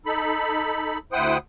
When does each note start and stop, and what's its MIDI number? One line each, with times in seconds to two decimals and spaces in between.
0.06 0.98 63
0.06 0.98 69
0.06 0.98 83
1.12 1.37 38
1.12 1.37 64
1.12 1.37 72
1.12 1.37 78
1.12 1.37 79
1.12 1.37 87